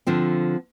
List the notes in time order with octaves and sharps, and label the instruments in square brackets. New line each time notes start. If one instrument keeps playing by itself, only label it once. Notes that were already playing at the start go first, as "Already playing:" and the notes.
[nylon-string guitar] D3 F3 C4 F4